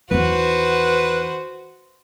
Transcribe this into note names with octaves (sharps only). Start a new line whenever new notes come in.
E2 D#3 F#4 B4 C5